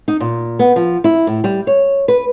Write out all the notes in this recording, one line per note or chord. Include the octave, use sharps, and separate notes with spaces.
D#4
A#2
B3
F3
E4
A2
G3
C#5
B4